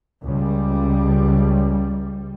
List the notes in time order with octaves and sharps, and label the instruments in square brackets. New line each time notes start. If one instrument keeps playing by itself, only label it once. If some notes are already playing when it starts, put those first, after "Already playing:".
[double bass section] C#2 G3